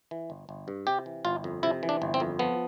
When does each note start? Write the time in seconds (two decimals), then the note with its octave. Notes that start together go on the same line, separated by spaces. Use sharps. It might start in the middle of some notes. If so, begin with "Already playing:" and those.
0.11 E3
0.30 G1
0.49 G1
0.68 G2
0.87 C3 G4
1.06 E3
1.25 G1 F4
1.44 F2
1.63 C3 E4
1.83 E3
1.89 D4
2.02 G1
2.14 C4
2.20 F2
2.39 F3 B3